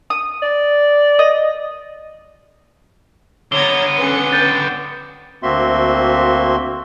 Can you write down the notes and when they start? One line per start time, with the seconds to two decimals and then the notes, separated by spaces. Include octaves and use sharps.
0.10 D#6
0.42 D5
1.19 D#5
3.52 D3 B3 C#5 A#5 G#6 A6 G7
3.98 C#4 A4 B4 C#7
4.32 G5 C#6 G6 A6
5.43 D2 A#3 C4 F#4 E5 C6